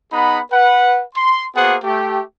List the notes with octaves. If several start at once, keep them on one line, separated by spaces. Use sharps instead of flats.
B3 D#4 G#4 F#5 B5
B4 F#5
C6
A#3 B3 F#4 G#4 C5 F#5
A3 G4